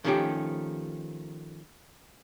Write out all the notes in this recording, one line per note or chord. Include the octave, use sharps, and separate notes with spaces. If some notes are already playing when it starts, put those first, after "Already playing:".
D#3 F3 A3 C#4 F#4 G4